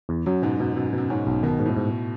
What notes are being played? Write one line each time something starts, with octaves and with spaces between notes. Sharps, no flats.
E2
F#2 F#3
G#2 B2
F#2 B2
F#2 B2
F#2 B2
G#2 C#4
B1
B2 D#3
G#2
A2
G#2